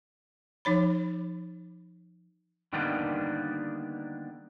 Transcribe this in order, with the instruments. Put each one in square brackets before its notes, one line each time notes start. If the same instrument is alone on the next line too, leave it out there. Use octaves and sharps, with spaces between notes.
[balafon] F3 D#4 C#5 B5
[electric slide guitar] D3 D#3 G3 A#3 B3 D4